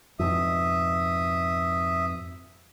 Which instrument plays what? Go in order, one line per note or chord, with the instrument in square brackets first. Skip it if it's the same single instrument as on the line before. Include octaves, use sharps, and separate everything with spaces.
[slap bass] F2 G#2 B2 [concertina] E5 D#6